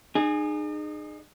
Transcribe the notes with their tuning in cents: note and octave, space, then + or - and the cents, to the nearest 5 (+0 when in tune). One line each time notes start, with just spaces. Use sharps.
D#4 -40 G#4 +0